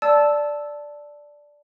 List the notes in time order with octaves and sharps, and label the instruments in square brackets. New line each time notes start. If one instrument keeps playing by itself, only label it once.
[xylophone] D5 A5 E6